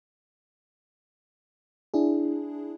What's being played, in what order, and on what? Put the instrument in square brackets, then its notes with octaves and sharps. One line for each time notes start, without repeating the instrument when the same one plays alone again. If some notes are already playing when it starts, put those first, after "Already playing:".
[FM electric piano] D4 E4 G#4